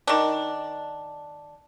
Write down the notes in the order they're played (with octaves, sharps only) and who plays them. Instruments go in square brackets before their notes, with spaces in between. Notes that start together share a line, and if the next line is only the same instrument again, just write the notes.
[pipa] D#3 D4